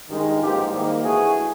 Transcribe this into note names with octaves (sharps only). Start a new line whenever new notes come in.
G2 D#3 G#3
A1 G#2 F3 A#3 F4 G4
G#2 D#3 G3 A#3
G2 E3 A3 F#4 G#4